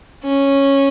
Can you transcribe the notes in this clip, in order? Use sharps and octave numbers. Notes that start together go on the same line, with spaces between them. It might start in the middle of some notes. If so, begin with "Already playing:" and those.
C#4